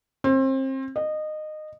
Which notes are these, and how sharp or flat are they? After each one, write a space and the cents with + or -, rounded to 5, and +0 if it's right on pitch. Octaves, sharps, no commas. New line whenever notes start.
C4 +30
D#5 -20